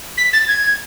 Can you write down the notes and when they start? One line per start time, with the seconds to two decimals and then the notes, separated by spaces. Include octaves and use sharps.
0.18 B6
0.33 A6
0.48 G#6